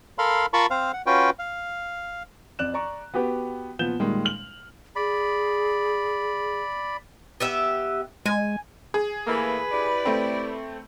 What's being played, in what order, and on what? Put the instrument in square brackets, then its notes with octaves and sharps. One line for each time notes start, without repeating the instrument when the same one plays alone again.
[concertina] A4 A#4 F5 B5 C6
F4 A#4 A5 B5 C#6
C4 C5 F5
F#5
C#4 F4 F#4 B4 G5
F5
[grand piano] F2 D5 F#6 E7
D5 A#5 C#6
B3 F#4 G4 B4
A#2 F3 B3 G6 E7 G7
A#2 D#3 G3 G#3
F6 F#7
[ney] G#4 [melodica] D5 B5
[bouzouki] B3 G4 E5
[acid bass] G#3 [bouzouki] G#5
[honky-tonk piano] G#4
[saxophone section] E3 A3 A#3 [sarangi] B4
[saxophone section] E4 G4 D5
[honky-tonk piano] A3 C4